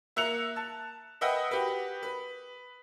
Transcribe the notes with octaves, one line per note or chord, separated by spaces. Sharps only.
A#3 E5 A#5 F#6 C#7 F7
A5
B4 D#5 E5 F#5 G5 D#6
F#4 G4 B4
B4